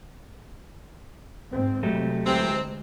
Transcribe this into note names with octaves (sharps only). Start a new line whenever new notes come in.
G#2 C4
C3 F#3 G#3 A3 G4
D2 C3 E3 G#3 C4